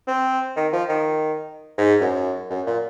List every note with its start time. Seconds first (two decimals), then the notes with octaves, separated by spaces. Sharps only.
0.08 C4
0.56 D#3
0.73 F3
0.89 D#3
1.78 G#2
2.01 F#2
2.50 F#2
2.67 A#2